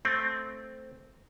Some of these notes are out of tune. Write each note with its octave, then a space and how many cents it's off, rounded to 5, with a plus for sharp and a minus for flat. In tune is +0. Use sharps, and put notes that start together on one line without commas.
A3 +0 C4 +0